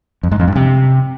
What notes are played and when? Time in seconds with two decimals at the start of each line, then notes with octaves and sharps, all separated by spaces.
0.23 F2
0.31 G#2
0.40 F2
0.48 G2
0.56 C3